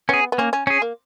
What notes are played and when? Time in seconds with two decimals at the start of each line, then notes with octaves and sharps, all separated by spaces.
0.09 B3 C#4 G#4
0.32 B3
0.38 A#3 C#4
0.53 C#4
0.67 C#4 G#4
0.82 A#3